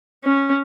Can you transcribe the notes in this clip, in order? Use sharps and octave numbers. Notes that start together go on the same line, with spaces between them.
C#4